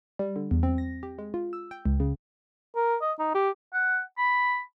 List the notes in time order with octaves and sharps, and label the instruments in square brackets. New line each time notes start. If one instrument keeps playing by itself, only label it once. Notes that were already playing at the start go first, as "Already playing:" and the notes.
[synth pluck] G3
D3
E2
C4
A#6
G4
G#3
F4
E6
G5
C#2
C#3
[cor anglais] A#4
D#5
D#4
G4
[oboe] F#5
B5